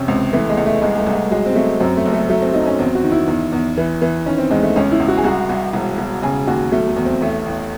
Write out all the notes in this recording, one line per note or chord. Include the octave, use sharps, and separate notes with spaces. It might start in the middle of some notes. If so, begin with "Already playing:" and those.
Already playing: E2 C3 C#4
C#2 C4
E3 A3
G#3
C#2
A3
C2 G#3
G#3
A3
C2
A3
F#3 G#3
C4
F#3 A3
F#2 C4
A3
F#1
A3
F#3 A3
C4
F#3 D#4
C#4
E2 C4
F#4
D#3
E4
E2
E2
E3
E3
D#3 C#4
C4
E2 G#3
A3
C#2 C#4
E4
C#2
F#4
G#4
C2 F#4
C2
E1
E1
C#3 G#4
D#2 F#4
F#3 A3
A3
E2
C4
A1 A3
A1